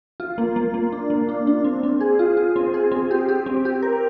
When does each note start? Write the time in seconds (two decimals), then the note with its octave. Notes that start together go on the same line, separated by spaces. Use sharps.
0.20 F4
0.38 A#3
0.56 A#3
0.74 A#3
0.92 D4
1.10 A#3
1.29 D4
1.47 D4
1.64 C4
1.83 C4
2.01 G#4
2.19 F4
2.37 F4
2.56 C4
2.74 G#4
2.92 C4
3.11 G4
3.29 G4
3.46 C4
3.65 G4
3.82 A#4